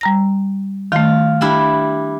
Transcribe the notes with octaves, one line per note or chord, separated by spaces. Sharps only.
G3 A#5 A#6
D#3 A3 F4
G3 D4 E4